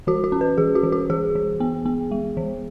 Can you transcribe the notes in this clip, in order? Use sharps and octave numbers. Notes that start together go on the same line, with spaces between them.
E3 F#4
F#4
C#4
B4
E3 G#4
F#4
E3
F#4
E3 G#4
E3
B3
B3
G#3
E3